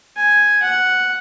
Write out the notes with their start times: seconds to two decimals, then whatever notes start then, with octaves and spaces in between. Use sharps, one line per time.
0.17 G#5
0.62 F#5